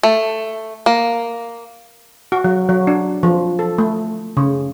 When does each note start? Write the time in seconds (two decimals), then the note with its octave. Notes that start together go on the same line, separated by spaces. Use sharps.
0.03 A3
0.86 A#3
2.32 F#4
2.44 F#3
2.69 F#3
2.87 D4
3.23 F3
3.59 A4
3.78 A3
4.37 C#3